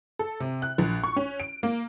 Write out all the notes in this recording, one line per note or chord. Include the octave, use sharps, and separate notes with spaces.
A4
C3
F#6
A#1
C#6
C#4
D7
A#3